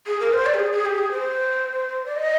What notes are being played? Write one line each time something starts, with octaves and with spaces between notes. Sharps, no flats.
G#4
A#4
C5
D5
G4
G#4
G#4
G4
G#4
C5
D5
D#5